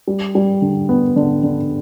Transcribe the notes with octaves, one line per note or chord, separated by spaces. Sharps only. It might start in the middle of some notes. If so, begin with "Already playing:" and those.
G3
G3
D3
B3
D3
D3